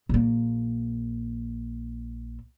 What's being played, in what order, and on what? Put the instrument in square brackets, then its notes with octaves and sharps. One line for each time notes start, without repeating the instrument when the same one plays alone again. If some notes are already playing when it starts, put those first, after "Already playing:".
[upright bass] A#1 A#3